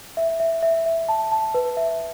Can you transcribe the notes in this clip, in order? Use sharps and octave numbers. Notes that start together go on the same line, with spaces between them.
E5
E5
E5
E5
A5
A5
B4
E5